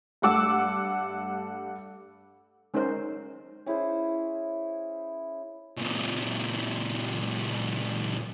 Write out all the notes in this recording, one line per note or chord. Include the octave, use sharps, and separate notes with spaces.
G2 A3 F#5 D6 E6
G#3 C#4 D#4 A#4 C5
C#4 E4 G#4 C5
C#2 A#2